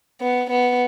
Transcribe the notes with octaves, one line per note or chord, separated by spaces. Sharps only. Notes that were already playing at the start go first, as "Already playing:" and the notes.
B3
B3